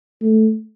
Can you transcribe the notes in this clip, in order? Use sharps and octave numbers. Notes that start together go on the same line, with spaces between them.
A3